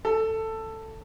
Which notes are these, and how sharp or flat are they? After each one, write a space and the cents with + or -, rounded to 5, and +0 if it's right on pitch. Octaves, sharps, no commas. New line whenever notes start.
A4 +10